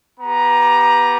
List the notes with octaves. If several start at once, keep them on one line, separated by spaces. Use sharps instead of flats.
B3 G4 A#5